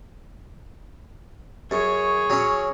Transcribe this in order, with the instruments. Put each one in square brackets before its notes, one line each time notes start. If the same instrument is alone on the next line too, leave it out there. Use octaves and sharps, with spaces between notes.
[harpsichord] F#2 [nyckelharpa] G#4 C#5
[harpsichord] F#3 C#4